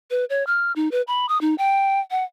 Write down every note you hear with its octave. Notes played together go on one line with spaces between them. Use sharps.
B4
C#5
F6
D#4
B4
B5
D#6
D#4
G5
F#5